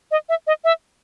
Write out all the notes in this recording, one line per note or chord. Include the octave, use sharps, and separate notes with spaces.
D#5
E5
D#5
E5